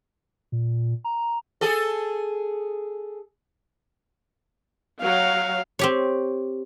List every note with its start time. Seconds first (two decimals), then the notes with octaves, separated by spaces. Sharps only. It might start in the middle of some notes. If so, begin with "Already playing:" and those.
0.52 A#2
1.04 A#5
1.61 G#4 A4
5.02 F#3 F5
5.79 C4 G4 C#5